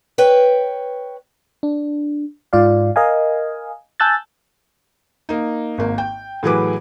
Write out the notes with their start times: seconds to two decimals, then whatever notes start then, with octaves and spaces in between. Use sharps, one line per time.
0.18 B4 C#5 G5
1.63 D4
2.53 G#2 F4 D5 F5
2.96 A#4 D#5 F5 G#5
4.00 G#5 A5 E6 F#6 G6 A6
5.29 A#3 D#4
5.78 G#1 A#3
5.98 G5
6.43 A2 E3 F#3 G#4 B4 D6